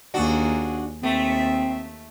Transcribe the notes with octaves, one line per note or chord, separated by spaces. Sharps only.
D#2 D4 F#4 G#4
D#2 A3 C4 E5